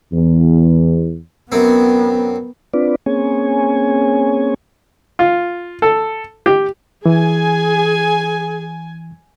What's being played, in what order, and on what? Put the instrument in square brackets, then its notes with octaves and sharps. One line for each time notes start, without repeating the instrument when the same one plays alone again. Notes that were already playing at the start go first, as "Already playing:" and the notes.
[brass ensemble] E2
[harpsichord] F#2 C4 [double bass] B3
[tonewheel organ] C4 D4 F4 B4 D5
A#3 C4 C#4 G#4 C#5 G#5
[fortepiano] F4
A4
G4
[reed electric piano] E3 [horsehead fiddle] G#4 [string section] G#5